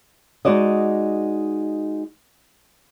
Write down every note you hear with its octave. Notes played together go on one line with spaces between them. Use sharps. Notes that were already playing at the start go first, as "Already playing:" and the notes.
G#3 D#4 F#4 D5 D#5